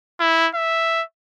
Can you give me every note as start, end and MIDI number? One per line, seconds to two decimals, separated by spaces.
0.20 0.48 64
0.55 1.03 76